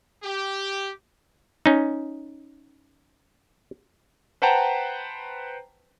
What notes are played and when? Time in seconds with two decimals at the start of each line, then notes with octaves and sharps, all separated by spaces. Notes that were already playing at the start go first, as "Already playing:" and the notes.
0.23 G4
1.66 C#4 D#4
4.42 B4 C5 F#5 G5 A5 A#5